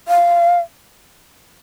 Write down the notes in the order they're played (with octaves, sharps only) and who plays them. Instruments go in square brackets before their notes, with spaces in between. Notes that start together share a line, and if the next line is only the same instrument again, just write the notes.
[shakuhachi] F5